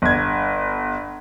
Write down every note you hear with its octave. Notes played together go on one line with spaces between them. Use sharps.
G1 G#6